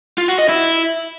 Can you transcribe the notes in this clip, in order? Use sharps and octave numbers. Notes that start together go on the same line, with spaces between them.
F4
F#4
D#5
E4